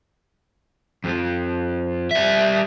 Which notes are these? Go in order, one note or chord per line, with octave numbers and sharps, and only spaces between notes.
F2 F3
G3 E5